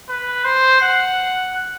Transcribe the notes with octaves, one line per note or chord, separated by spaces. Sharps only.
B4
C5
F#5